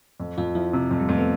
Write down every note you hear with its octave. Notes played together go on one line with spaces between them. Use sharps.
F2
F2 F4
F3 E4
C3
F2
G3
F2 A3
B3